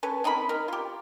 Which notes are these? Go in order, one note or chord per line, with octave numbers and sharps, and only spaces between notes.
C#4 A4 B4
C4 D#4 A#4 B5
A#4
F4 G4